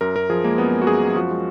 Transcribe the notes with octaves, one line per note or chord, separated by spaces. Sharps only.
F#2 A#4
F#2 A#4
F3 G#4
G#3 A#3
F#2 B3
G#3
F#4
F#2 G#4
F#2
F3 F#4
G#3